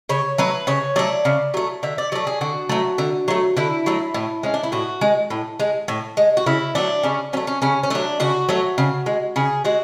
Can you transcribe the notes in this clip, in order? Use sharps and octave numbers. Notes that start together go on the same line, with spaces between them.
C#3 C#5
F#3 A3 B4
C#3 C#5
F#3 A3 D5
C#3
F#3 A3
D3 E5
D5
F#3 A3 D5
G#4
D3 F#4
F#3 A3
D3
F#3 A3
D3 E4
F#3 A3
A2
G#3 C#4
D4
E4
A2 F#4
G#3
A2
G#3
A2
G#3
F#4
C#3 E4
F#3 A3 D4
C#3 C#4
F#3 A3 C#4
C#4
C#3 C#4
C#4
F#3 A3 D4
C#3 F#4
F#3 A3
C#3
G#3
C#3 G#4
G#3 F#4